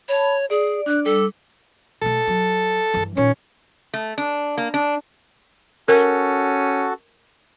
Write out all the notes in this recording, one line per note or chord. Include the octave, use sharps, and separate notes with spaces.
C#5 A5 B5
G#4 D5
D4 D5 F#6
G3 A4 D6
B2 A3 A4
F#3
G2 E3
A#2 D#3 C#4
A3
D4
A#3
D4
C#4 F#4 A4 A#4